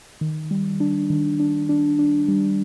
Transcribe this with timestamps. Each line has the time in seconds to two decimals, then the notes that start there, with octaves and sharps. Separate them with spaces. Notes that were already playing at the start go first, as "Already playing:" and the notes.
0.21 D#3
0.51 G3
0.80 D4
1.10 D#3
1.40 D4
1.69 D4
1.99 D4
2.28 G3